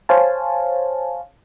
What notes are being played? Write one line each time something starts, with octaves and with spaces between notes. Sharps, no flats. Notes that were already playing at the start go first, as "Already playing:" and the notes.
C5 C#5 F5 G#5 A5